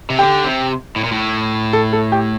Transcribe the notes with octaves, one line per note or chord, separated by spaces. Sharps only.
C3
D3 G4
C3
A2
A#2
A2
A4
A4
G4